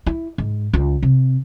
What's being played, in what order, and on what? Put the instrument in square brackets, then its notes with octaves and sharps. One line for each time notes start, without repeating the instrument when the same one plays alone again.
[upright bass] E4
G#2
C#2
C3